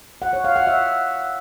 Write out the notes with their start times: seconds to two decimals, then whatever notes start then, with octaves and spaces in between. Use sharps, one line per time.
0.22 F#5
0.33 C#5
0.44 F5
0.56 F#5
0.67 E5